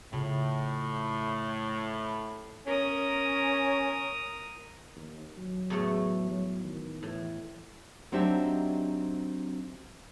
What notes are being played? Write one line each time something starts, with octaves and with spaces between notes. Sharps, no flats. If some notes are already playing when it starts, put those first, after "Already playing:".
A2 C#3 F4
C#4 A#4 D#6
D#2
F#3
E2 A2 A3
F#3
D#3
A2 E3
F#3 C4 D4 D#4 G4 E5